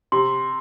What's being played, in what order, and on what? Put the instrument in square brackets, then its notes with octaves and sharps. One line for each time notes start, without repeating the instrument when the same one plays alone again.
[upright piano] C3 [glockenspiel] C6